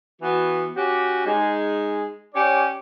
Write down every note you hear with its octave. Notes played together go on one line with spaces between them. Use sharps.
E3 B3 F#4
C#4 F#4 G4
G#3 D#4
C#4 G4 C#5 D5